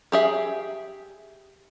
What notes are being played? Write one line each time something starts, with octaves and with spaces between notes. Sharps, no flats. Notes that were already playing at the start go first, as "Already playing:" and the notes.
G4 G#4 E5